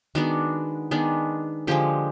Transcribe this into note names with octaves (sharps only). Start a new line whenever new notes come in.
D#3 G#3 B3 D4 F#4
D#3 G#3 B3 D4
D3 F3 G#3 G4